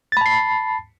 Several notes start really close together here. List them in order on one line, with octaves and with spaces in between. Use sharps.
A6 B5 A5 C7